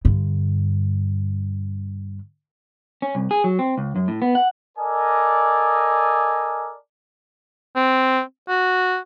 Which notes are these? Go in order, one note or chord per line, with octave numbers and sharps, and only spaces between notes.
G2 D3
C#4
C2
G#4
F#3
C4
C#2
F#2
A2
B3
F#5
A4 A#4 D5 D#5 G#5
C4
F#4